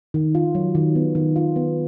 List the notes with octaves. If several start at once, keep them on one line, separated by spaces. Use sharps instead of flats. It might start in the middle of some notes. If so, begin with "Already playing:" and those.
D#3
F4
F#3
D#3
B3
D#3
F4
B3